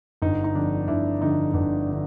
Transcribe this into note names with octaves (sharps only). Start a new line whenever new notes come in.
G1 D#4
D#4
F2 D3 D4
G1 D4 E4
F2 D3 D#4
G1 D4
D3